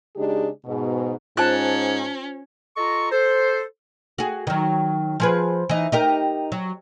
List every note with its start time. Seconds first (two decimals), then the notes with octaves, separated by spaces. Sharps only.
0.16 C#3 G#3 D4 D#4 G4 G#4
0.65 G#2 B2
1.37 G#2 C#4 F4 C5 A5 F#6
2.77 F4 A4 D#5 A#5 C#6
3.12 A4 C5
4.18 F#4 G#4
4.47 D#3 F#3
5.20 F3 G#4 B4
5.70 E3 D#4
5.92 D#4 G4 A#4
6.52 F#3